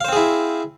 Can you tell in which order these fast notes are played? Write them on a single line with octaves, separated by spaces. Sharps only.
F5 C5 C4 G#4 E4